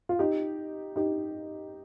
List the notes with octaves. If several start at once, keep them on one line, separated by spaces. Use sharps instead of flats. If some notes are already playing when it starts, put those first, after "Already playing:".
F4
D#4 G4
D#4 G4